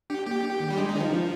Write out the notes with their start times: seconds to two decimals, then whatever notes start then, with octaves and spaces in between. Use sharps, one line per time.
0.10 D4 G4
0.26 A#3 G4
0.43 D4
0.60 D#3
0.71 G3
0.78 G#3 D4
0.89 D#4
0.95 D#3 D4
1.00 F3
1.12 D4